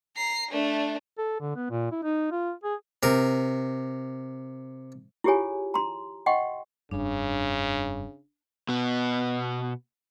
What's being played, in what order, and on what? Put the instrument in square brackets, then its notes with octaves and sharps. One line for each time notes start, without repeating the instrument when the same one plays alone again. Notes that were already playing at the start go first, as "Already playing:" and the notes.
[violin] A#5 C7
A3 D4
[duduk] A4
D3
B3
A#2
E4
D#4
F4
G#4
[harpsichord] C3 A#4
[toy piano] E4 F4 G4 G#4 C#5 G#5
A#5 C6
D#5 F#5 G5 C6 C#6
[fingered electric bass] F1 G2 [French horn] C#3 [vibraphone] D4
[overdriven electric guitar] B2 B3